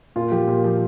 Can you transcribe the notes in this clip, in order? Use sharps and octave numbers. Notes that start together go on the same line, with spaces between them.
A#2 F4
F3 G4
A#2
F3